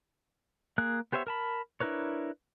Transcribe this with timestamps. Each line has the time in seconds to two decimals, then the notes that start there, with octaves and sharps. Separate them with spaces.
0.78 A#3 G#4 F5 F#6
1.12 B3 G4 C5 C#5 E5
1.27 A#4 A5 B5
1.80 D4 E4 A#4 B4 C#5